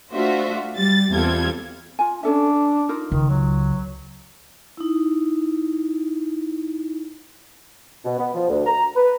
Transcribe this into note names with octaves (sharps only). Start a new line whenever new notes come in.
A3 D4 F4 F#4 C5 E5
G3 G4 A6
E2 G3 C4 F4 A4 G#6
F4 G#5
C#4 D4 A4 E5
D#4 F4 A#4
C#2 D#3
F#3
D#4 E4
B2
B3
F3
D2
A#5
B4